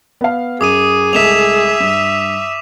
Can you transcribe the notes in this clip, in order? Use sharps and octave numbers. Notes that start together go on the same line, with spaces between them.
B3 F5
F#2 G#4 D6 D#6 D#7
C2 G#3 A3 E5 B6 E7 F7
G2